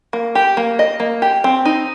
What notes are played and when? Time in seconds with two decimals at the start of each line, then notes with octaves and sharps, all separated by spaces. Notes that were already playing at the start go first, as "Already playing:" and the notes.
0.13 A#3
0.35 G4
0.57 A#3
0.79 D#5
1.00 A#3
1.22 G4
1.44 C4
1.65 D#4